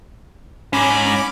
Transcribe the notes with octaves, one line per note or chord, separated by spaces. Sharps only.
G#2 C#4 B5 D6